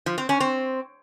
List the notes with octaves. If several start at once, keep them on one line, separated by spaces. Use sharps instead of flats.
F3
C4
C#4
C4